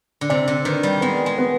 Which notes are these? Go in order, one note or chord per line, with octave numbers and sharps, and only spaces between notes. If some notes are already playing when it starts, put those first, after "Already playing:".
D3
C3 D5
D3
D#3 B4
G3
G#3 B3
G#3
B3